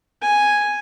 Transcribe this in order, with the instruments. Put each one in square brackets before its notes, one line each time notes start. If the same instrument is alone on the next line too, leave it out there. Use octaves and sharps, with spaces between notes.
[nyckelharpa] G#5